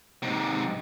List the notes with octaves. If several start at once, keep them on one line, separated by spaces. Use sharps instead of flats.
G#2 C3